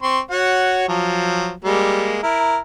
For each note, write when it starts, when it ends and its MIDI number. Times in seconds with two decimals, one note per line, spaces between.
0.03 0.20 60
0.03 0.20 84
0.03 0.20 85
0.31 0.84 66
0.31 0.84 73
0.31 0.84 78
0.88 1.52 53
0.88 1.52 54
1.65 2.20 55
1.65 2.20 56
1.65 2.20 58
2.23 2.58 64
2.23 2.58 70